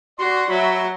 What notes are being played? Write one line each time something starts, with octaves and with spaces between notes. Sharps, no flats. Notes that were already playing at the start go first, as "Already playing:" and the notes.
F#4 D5 C6
F#3 E5 B5